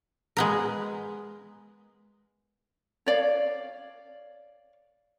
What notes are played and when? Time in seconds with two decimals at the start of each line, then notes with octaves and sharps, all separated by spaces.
0.37 G#3 B3 A#4
3.06 C#5 D5 F5